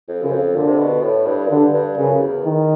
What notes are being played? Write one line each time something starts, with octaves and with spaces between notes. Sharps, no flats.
F2
F#2 C#3
F2
A#2 D3
C3
B2
A2
G2
F#2
G2 D3
G2
F#2 C#3
E2
D#3